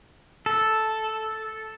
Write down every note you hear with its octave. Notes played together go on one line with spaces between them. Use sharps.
A4